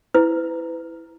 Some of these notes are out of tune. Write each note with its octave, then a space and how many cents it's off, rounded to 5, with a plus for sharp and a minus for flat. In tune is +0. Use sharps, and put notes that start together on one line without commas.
E4 +0 B4 +30